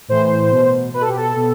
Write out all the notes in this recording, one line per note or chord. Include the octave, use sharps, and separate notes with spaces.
A2 E3 C5
B2
B2 B4
A4
G4
A4
B2